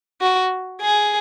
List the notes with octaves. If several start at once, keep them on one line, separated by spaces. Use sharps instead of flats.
F#4
G#4